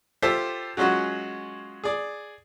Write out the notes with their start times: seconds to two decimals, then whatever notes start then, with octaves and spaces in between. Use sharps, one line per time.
0.22 F4 G4 A4 C5 E5
0.77 F#3 G#3 C#4 F4 F#4
1.84 G#4 D5